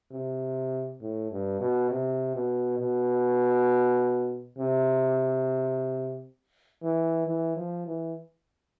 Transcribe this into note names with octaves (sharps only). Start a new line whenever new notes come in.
C3
A2
G2
B2
C3
B2
B2
C3
E3
E3
F3
E3